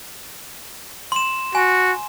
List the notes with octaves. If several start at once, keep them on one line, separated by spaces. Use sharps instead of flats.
C6 E7
F#4 G#5